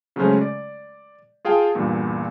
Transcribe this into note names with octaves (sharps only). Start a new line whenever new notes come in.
C#3 F#3 G#3 A3 C#4 C5
D5
F4 G#4 F5 G5 A5
E2 G2 A#2